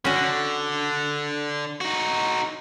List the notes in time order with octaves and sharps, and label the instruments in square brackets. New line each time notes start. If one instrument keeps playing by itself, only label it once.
[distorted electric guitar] D3 [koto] C#4 F#4
[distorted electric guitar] D#4 F#4